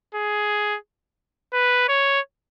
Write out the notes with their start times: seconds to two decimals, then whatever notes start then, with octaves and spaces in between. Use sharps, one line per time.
0.15 G#4
1.53 B4
1.89 C#5